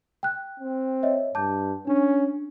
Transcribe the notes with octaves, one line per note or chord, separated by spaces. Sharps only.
G5 F#6
C4
C#5 D#5 E5
G2 A5 D6 G6
C#4 D4